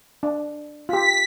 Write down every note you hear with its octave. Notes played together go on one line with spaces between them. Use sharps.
D4
F4 G4 B6